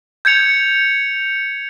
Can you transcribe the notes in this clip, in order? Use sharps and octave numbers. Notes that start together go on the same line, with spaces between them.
G6 G#6 C#7 F7